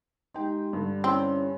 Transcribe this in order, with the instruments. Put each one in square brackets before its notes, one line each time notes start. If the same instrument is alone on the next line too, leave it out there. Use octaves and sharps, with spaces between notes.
[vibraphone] G#3 G4 C6 [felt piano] D#4 G5
[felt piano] G2 D3
[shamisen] C4 [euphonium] C#4 [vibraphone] E4